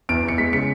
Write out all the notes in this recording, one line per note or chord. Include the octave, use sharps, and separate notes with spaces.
E2 D7
E2
C#7
G#3 B6
C#3 C#7